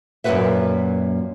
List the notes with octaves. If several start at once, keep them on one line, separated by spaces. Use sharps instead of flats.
F#2 A#2 F3 F#4 B4 E5